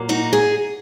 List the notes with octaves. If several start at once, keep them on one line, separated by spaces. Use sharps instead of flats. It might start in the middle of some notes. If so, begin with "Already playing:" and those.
Already playing: A#2 F#3 A#3
D#4 F#4
G#4